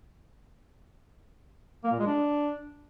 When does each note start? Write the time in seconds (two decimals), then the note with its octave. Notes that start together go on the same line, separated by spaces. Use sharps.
1.84 A#3
1.91 A#2
1.99 G#3
2.07 D4